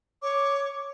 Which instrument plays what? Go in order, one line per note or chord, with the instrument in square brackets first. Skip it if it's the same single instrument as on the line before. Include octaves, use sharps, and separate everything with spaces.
[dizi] C#5 [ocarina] D6